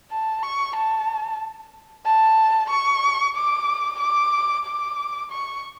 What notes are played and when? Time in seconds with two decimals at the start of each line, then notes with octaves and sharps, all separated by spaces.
0.11 A5
0.43 C#6
0.76 A5
2.05 A5
2.70 C#6
3.36 D6
4.00 D6
4.65 D6
5.31 C#6